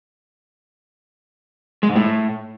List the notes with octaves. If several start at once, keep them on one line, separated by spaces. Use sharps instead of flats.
G#3
G#2
A2